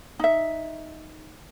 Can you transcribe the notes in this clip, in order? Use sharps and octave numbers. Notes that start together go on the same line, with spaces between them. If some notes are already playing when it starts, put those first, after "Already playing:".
D#4 E5